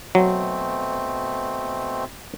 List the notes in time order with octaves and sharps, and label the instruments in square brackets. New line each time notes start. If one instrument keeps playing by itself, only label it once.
[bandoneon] B2 A3 C4 [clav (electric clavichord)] F#3